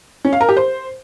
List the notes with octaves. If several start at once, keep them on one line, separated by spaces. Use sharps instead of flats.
C#4
F5
A#4
G4
C5